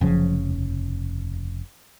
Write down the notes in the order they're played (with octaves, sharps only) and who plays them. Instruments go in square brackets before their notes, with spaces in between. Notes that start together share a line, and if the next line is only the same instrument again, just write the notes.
[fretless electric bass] F1 C#3 [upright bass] F3 F#3
[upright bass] D#2